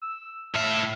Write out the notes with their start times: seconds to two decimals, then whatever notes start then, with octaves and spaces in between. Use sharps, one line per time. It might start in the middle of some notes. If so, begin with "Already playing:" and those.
0.02 E6
0.55 A2 E5 F5